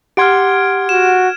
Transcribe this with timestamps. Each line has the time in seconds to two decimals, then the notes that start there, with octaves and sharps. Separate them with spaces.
0.17 G4 F#5 C6 F6 G#6 D7
0.89 F#4 E7